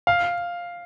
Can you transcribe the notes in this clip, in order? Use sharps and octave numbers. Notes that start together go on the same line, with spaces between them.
F5